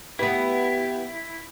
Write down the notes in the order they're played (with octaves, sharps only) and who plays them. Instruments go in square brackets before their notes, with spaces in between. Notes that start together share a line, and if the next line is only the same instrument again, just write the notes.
[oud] B3 B4 [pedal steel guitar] E4 [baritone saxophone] G4